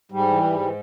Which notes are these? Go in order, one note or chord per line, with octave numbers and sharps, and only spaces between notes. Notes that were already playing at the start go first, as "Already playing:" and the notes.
G#2 G3
E3
G#2
E3